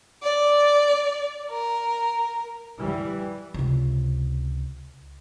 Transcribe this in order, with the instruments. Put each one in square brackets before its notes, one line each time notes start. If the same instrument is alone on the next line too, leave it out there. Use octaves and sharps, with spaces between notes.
[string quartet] D5
A#4
[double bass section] E3 G3
[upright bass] C#2 C3